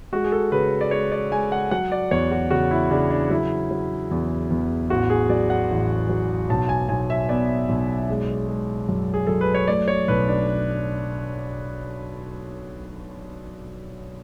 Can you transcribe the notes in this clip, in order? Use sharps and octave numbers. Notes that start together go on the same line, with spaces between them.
G#3 F#4
G#4
A4
C#3 B4
D5
G#3 C#5
D5
G#3 G#5
F#5
F#3 F#5
D5
E2 C#5
F#4
C#3 F#4
E4
C#3 D4
D4
F#3 E4
F#3
E2
E2
A1 F#4
G#4
F#3 D5
F#5
A1
F#3
B1 A5
G#5
B1 G#5
E5
B3 D5
B1
G#3
G#3
F#2
G#4
F#2 A4
B4
C#5
A3 D5
C#5
B1 B4
D4